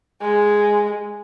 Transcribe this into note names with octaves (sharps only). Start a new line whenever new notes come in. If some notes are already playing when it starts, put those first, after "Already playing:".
G#3